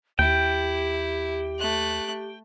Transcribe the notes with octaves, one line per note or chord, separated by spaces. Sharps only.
D#2 E4 G4 G5
A3 F#6